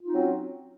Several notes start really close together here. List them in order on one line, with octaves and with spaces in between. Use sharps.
F4 D#4 C4 F#3 C#4